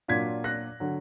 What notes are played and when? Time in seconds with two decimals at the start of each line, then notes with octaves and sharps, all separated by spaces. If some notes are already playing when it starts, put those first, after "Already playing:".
0.08 A#2 F#3 D4 F4 G#6 B6
0.44 F#6 A#6
0.80 D3 F#3